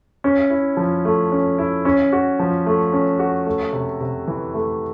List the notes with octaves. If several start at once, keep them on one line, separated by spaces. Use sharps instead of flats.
C#4
E4
F3
A3
C#4
E4
C#4
F#4
F3
A3
C#4
F#4
A3
C3
C3
E3
A3